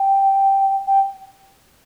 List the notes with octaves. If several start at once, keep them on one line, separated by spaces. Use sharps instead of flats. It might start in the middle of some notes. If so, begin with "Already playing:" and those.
Already playing: G5
G5